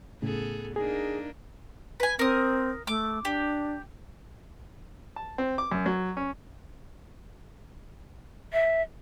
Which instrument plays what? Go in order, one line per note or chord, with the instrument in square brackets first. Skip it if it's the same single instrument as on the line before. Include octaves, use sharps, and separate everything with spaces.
[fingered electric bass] A2 C#3 [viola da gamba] B3 G#4 A4
[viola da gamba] A#3 D4 D#4 [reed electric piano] G#4
[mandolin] B4 G#5
[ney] C4 [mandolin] A#4 D#6
[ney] A3 [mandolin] D6
[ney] D4 [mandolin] G4
[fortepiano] A5
C4
D6
F#2
F#3
C#4
[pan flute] E5